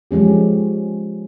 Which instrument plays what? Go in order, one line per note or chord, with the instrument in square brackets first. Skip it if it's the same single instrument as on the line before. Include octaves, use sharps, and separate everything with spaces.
[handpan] F3 G#3 C#4 G4